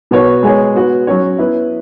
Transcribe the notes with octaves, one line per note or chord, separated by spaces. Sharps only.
B2 B3 F#4 C#5
G#3 B3 G#4 C#5
B3 F#4 B4
F#3 C#4 F#4 C#5
B3 E4 B4